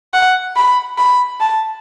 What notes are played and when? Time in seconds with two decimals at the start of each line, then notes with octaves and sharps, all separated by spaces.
0.13 F#5
0.56 B5
0.98 B5
1.40 A5